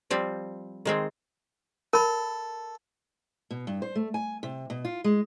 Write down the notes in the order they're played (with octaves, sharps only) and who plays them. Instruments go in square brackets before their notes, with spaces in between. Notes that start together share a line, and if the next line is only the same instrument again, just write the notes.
[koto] F3 G3 C4
D#3 G#3 C4
[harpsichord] A4 [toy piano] A#4 B5
[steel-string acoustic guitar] B2
G2
C5
A3
G#5
C3
B2
F4
G#3